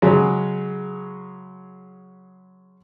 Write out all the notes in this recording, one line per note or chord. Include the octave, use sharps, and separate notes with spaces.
C#3 F#3 G#3